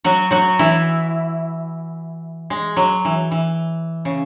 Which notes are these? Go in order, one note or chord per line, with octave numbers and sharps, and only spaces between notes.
F#3 F#4
F#3 F#4
E3 E4
G#3
F#3
E3
E3
C#3